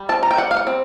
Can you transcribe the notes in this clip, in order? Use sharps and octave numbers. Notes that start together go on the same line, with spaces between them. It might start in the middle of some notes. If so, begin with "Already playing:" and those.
Already playing: G3
C4 A5
A#5
G5
G3 F#5
F5
F#5
C4